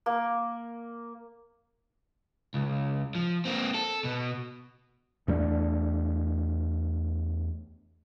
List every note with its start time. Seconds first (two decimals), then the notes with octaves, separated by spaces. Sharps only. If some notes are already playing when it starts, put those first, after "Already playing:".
0.06 A#3
2.54 C#2
3.15 F3
3.45 A#3 C4
3.74 A4
4.04 B2
5.28 E2 A3 C#4 D4